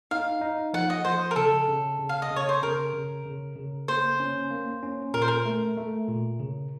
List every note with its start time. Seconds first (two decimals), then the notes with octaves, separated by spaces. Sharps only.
0.11 D#4 F5
0.41 D#4
0.73 F3 F#5
0.90 D#5
1.05 F3 C5
1.31 A#4
1.36 C#3 A4
1.68 C#3
1.99 C#3
2.09 F5
2.22 D#5
2.30 C#3
2.36 C#5
2.49 C5
2.62 C#3 A#4
2.94 C#3
3.25 C#3
3.56 C#3
3.88 A#3 C5
4.20 C#4
4.50 A#3
4.83 C#4
5.14 A#2 A#4
5.22 C5
5.28 A#4
5.45 A3
5.77 A3
6.08 A#2
6.40 C#3